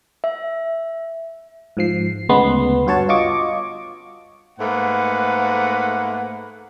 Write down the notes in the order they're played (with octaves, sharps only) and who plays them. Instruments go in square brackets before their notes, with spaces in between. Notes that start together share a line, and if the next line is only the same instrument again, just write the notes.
[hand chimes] E5
[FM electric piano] G#2 F3 C7
D2 C#3 G#3 B3 C6
G2 F#4 C#5 A5
F4 D#5 C#6 D6
[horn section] G#2 A3 A#3 B4 F#5